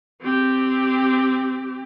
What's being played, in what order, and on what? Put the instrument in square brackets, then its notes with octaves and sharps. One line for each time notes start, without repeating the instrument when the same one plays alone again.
[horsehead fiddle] C4 G4